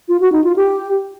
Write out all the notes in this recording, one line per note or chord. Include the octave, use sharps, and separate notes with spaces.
F4
F#4
D#4
F4
G4